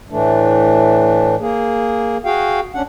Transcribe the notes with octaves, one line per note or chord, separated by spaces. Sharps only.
A2 E3 A3 D4
A#3 G#4
F#4 G#4 F5 G5
D2 C#4 D4 F#5